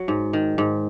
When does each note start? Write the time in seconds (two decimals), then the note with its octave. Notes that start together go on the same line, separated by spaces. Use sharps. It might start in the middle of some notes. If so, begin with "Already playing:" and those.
Already playing: F#3
0.08 G#2
0.33 D#3
0.58 G#2